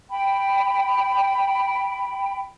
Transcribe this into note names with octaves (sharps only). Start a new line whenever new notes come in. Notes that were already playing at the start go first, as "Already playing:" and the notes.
G5 B5